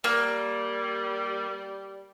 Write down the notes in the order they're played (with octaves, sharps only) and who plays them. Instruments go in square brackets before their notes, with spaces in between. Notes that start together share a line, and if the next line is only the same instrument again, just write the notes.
[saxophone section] G3 [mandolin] A#3